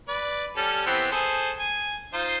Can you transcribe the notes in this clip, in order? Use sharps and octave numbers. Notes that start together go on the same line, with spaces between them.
B4 D5
G3 C#4 A4
E3 B3 C4
G#4 A4 C5
G#5
D#4 F4 C5